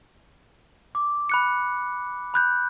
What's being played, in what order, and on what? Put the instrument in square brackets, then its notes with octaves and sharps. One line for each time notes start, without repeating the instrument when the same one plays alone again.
[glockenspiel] D6
B5 F#6 C#7
B5 F#6 G6